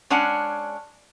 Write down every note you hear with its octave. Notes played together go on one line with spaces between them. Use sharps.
G#3 C#4 D4 F#5